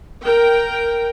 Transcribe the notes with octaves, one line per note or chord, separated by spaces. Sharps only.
A#4 G5